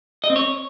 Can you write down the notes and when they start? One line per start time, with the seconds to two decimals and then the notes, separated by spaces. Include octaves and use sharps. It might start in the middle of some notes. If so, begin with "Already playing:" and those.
0.24 D#5
0.30 C4
0.36 C#5